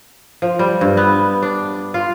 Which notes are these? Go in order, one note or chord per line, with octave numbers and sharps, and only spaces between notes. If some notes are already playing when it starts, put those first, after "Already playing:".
F3
G3
G2
B3
D4
F4